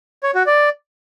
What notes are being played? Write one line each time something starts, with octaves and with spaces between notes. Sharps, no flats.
C#5
F#4
D5